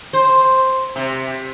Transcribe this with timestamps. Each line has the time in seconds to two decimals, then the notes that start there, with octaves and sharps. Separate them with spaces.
0.13 C5
0.96 C3